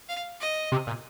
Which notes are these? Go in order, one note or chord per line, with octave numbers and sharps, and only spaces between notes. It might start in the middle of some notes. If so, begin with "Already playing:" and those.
F5
D#5
C3
A#2